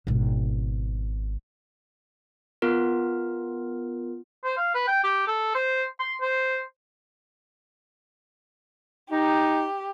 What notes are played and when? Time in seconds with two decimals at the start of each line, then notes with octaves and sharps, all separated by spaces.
0.07 G#1 B2
2.62 B3 F4 A#4
4.45 C5
4.57 F5
4.74 B4
4.88 G5
5.04 G4
5.28 A4
5.55 C5
6.00 C6
6.21 C5
9.11 D#4 G4